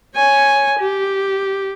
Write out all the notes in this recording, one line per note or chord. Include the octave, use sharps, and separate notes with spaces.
C#5 G#5
G4